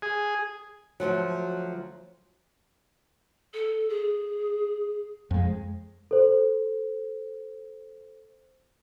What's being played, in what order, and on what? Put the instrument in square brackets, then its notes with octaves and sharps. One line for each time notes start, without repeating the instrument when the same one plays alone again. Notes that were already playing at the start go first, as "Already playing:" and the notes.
[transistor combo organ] G#4
[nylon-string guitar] D2 A#2 F3 F#3
[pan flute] A4
G#4
[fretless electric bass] F2 G#3
[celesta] A4 C5